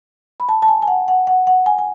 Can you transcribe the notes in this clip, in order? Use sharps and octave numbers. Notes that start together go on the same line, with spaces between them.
B5
A5
A5
G#5
G#5
F#5
F#5
F#5
F#5
G#5
G#5